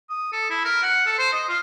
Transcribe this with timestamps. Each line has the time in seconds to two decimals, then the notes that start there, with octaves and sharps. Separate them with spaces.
0.10 D#6
0.32 A4
0.50 E4
0.65 A#4
0.83 F#5
1.06 A4
1.18 C5
1.33 D#5
1.48 F4